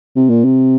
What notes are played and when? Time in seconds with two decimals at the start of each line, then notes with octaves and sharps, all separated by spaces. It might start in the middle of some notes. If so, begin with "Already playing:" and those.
0.16 C3
0.29 A#2
0.44 C3